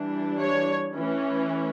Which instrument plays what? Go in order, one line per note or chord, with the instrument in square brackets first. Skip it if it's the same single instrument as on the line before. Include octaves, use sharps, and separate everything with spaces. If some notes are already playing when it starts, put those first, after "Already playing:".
Already playing: [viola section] E3 G3 D4
C#5
E3 A3 C#4